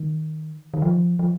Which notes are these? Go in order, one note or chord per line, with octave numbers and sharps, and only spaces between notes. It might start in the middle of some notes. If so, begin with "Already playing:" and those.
Already playing: D#3
D#3
F3
F3